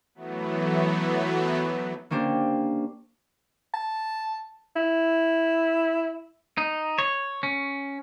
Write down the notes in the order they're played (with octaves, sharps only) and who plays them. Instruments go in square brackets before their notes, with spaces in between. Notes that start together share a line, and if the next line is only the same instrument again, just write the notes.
[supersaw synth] E3 F#3 A3 B3
[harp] A#3 C#4 D4 G4 C5
[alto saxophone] A5
E4
[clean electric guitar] D#4
C#5
C#4